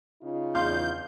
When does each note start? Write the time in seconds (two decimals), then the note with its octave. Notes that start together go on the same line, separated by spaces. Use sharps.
0.22 C#3 D#4 F4
0.55 E2 F5 C6 G6